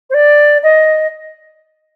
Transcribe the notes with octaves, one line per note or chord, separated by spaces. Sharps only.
C5
D5
D#5